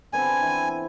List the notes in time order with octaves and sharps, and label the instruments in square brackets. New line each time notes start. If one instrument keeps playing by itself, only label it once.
[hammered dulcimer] D3 B3 C4 [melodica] G#5
[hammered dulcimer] E3 E4